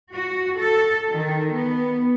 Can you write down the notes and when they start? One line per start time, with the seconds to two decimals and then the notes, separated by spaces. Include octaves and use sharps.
0.13 F#4
0.57 A4
1.11 D#3
1.53 B3